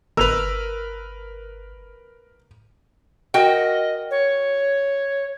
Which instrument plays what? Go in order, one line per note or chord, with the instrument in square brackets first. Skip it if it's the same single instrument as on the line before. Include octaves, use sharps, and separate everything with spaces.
[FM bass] G1 [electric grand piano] A#4 B4 [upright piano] E6 F7
[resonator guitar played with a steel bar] F#4 A#4 G5 [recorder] D#5
[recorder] C#5